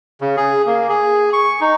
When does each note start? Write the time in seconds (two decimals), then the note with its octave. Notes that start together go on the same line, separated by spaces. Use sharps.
0.21 C#3
0.37 G#4
0.66 A#3
0.90 G#4
1.33 C#6
1.61 D#4